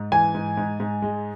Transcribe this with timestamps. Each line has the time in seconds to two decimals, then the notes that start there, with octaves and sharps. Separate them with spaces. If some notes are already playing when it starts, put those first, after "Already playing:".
Already playing: G#2
0.12 E3 G#5
0.35 G#2
0.57 G#2
0.80 G#2
1.02 G#3